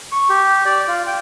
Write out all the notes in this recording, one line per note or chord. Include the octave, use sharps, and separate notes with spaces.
C#6
G4
D5
F4
G5